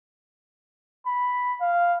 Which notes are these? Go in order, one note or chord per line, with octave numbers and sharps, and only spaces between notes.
B5
F5